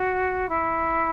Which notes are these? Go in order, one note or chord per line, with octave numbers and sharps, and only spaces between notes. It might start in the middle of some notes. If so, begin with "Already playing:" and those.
Already playing: F#4
E4